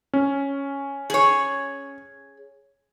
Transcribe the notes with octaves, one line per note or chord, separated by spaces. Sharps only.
C#4
G#4 C#5